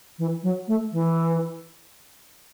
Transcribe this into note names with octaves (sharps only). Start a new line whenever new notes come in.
E3
F#3
A3
E3